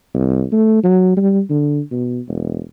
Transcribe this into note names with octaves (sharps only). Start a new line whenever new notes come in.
C2
A3
F#3
G3
D3
B2
E1